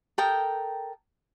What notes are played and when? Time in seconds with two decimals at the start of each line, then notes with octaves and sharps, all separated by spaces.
0.18 A4 A#4 G5 D#6